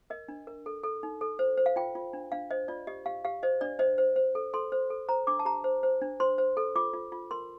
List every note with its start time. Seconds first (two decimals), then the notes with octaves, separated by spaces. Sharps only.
0.10 A#4 D#5
0.28 D4
0.47 A#4
0.66 A4
0.83 A4
1.03 D#4
1.21 A4
1.39 C5
1.58 C5
1.66 F5
1.76 F4 G5
1.95 F4
2.13 D4
2.32 D4 F5
2.50 C5 D#5
2.68 F4 D5
2.87 G4 D#5
3.06 G4 F5
3.25 G4 F5
3.43 C5 D#5
3.61 D4 D5
3.79 C5 D#5
3.98 C5
4.16 C5
4.35 A4
4.53 A4 C6
4.72 C5
4.90 A4
5.08 C5 A#5
5.27 D4 D6
5.39 A5
5.45 G4 A#5
5.64 C5
5.83 C5
6.02 D4
6.20 C5 C6
6.38 C5
6.57 A4
6.76 F4 D6
6.93 F4
7.12 F4
7.31 A#4 C6